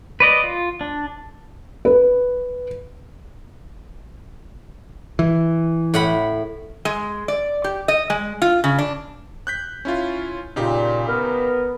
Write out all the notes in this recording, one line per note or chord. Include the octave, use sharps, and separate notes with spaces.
B4 D5 D#5
F4
D4
B4
E3
A2 F#5 B5
G#3
D5
G4
D#5
G#3
F4
C#3
D4
F#6 G6 B6
C#4 E4 F4
A#2 C#3 D#4 G4
B3 A#4